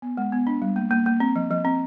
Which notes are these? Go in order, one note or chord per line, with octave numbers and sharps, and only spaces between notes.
B3
G#3
B3
D4
G3
A#3
A#3
A#3
C4
F3
F3
C4